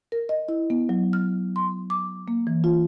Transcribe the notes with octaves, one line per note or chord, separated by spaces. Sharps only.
A#4
D#5
E4
B3
F#3
F6
C6
D6
A#3
E3
F4